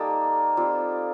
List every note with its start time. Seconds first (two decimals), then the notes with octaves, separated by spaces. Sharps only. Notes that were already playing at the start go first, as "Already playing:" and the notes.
Already playing: G3 A#3 D#4 A4
0.57 G3 C4 F4